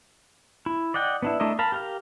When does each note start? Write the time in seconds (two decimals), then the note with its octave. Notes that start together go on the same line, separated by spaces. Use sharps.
0.66 E4
0.94 D5 D#5 F#5 G5
1.22 B3 D4 E4
1.40 A3 D4 E4 A#4 D#5
1.59 A#4 F5 A5 B5
1.72 G4 A#4 F5